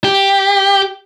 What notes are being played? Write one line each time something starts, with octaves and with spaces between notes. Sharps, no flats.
G4